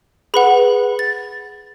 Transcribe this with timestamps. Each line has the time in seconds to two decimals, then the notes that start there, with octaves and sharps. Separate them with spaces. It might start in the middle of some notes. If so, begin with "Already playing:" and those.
0.34 G#4 B4 F#5 B5
0.99 A6